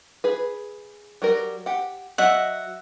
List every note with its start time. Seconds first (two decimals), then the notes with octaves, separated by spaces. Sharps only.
0.24 G#4 B4
1.22 F#3 G3 A#4
1.66 G4 F#5
2.18 F#3 D#5 E5 F#5